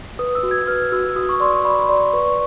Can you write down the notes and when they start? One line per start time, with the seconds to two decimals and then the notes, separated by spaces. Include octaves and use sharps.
0.19 B4 D#6
0.35 E6
0.43 F#4
0.51 G#6
0.67 B4 F6
0.92 F#4 E6
1.16 F#4 D#6
1.29 C#6
1.40 D5 C6
1.53 C#6
1.65 D5 B5
1.89 D5 C6
2.13 B4 C#6